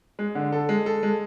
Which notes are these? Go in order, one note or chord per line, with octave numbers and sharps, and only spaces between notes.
G#3
D3
A4
G#3
A4
G#3